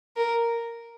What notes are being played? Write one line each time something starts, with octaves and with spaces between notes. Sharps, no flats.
A#4